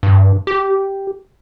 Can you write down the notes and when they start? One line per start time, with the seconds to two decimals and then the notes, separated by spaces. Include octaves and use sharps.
0.03 G2
0.47 G4